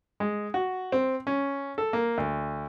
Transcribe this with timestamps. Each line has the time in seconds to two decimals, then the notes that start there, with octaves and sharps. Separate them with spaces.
0.20 G#3
0.54 F#4
0.92 C4
1.27 C#4
1.78 A4
1.93 A#3
2.18 D2